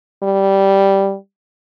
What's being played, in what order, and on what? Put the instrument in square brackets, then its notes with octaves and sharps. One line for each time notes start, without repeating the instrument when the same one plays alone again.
[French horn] G3